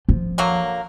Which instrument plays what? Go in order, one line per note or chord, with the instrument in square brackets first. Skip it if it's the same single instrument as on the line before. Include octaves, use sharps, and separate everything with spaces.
[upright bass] F3
[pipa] D3 F#3 A#3